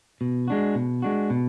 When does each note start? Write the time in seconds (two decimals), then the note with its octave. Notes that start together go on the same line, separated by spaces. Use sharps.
0.21 B2
0.48 G#3 D4 F#4
0.75 B2
1.02 G#3 D4 F#4
1.30 B2